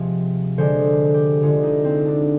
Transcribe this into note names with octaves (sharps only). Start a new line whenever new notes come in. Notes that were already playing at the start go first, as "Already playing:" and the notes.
Already playing: C3 F3 G#3
D3 G#3 C5
G4
D3 G#3 F4
D#4
C4
D4